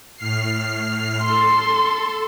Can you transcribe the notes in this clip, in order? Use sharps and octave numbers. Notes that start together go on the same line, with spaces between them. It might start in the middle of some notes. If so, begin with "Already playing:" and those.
A2 F6 C7
A4 C6